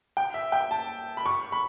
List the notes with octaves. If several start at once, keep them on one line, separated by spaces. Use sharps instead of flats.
G5
E5
G5
A5
B5
C#6
B5